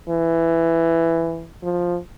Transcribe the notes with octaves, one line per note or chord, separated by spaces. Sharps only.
E3
F3